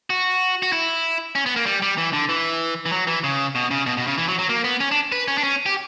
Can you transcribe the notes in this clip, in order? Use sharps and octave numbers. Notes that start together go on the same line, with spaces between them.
F#4
F#4
E4
C#4
B3
A#3
G3
G3
E3
D3
E3
E3
F#3
E3
C#3
B2
C#3
B2
B2
C#3
E3
F#3
F#3
A#3
B3
C#4
D4
B4
C#4
D4
C#4
G4